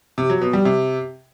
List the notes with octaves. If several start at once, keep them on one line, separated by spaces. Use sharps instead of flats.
C3
F#3
B2
G3
C3